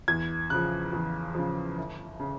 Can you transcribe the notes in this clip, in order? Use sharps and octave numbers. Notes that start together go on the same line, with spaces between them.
E2 G#6
C#3 F3 F#6
E2
C#3 F3
G1
C#3